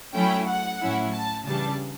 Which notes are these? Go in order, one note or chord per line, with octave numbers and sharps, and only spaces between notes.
F#3 A3 C#4 E4 G5
F#5
A2 F#3 C#4 E4
A5
C#3 E3 G3 D4 A5